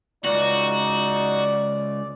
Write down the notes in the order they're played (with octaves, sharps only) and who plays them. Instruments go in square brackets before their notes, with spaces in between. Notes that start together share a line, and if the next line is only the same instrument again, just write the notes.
[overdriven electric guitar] C#2 [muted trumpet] D#4 [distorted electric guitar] F#4 [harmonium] D5